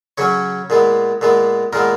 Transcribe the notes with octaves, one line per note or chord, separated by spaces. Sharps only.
C#3 F#3 C#4 C#5
A#2 G#3 B3
A#2 G#3 B3
A#2 G#3 B3 A#4